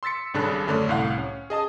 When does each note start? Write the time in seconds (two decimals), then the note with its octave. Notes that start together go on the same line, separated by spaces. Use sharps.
0.03 C6 E6 A6 B6 C#7
0.34 G#1 G2 C#3 D4 A4 F#6
0.67 F#2 D3 A3 C#4 D4
0.89 C2 A2 F5 F#5
1.18 C#4
1.50 G#4 D#5 A5 D#6